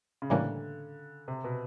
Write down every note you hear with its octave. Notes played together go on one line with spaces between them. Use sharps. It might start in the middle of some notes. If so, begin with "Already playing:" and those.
C#3
A2 D3 E3 G3 A#3 C#4
C3
B2